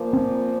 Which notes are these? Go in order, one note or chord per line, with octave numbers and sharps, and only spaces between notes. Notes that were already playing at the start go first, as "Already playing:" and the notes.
Already playing: A#2 F3 A#3
C4